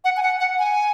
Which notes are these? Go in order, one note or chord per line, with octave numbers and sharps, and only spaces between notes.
F#5
G#5
F#5
F#5
G#5